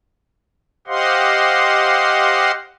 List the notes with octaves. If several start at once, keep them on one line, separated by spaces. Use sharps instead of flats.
G4 C5 D#5 F5 F#5 C6